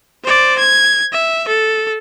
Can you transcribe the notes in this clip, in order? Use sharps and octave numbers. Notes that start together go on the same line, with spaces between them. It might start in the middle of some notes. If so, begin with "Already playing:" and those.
C5 D5
G#6
E5
A4